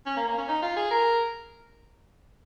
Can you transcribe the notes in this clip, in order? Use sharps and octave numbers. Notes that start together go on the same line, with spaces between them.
C#4
A#3
A#3
C#4
D#4
F4
G#4
A#4